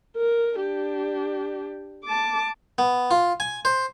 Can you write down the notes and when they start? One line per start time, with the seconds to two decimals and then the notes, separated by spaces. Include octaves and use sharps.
0.17 A#4
0.57 D4 G4
2.05 A5 D6
2.78 B3
3.11 F4
3.40 G#5
3.65 C5